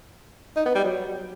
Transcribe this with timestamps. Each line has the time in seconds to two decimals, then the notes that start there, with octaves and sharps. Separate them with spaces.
0.56 D#4
0.65 B3
0.75 G3
0.84 F#3